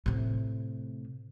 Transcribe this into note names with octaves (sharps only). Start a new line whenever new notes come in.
A2 C3